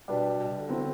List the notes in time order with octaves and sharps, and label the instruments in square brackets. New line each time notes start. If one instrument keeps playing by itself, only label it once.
[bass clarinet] B2 [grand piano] G3 D4 G4 B4
[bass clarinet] B2
C3
D3
[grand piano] F#3 C4 E4